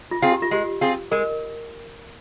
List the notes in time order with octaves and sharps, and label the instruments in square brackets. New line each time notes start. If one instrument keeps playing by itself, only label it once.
[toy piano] F4
[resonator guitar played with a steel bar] C4 F4 G#4
[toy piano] G4
F4
[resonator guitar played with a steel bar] G#3 [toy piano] G4
[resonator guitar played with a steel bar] C4 F4 G#4
[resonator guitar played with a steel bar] G#3 [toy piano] A#4